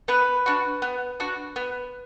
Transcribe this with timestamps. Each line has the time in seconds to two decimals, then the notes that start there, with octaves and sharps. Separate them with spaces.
0.08 B3 B4
0.46 D4 F#4
0.82 B3
1.20 D4 F#4
1.56 B3